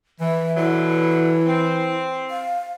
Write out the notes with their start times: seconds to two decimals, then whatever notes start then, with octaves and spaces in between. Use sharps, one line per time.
0.20 E3 E5
0.57 B2 D3 F#3 E4
1.47 C4
2.30 F5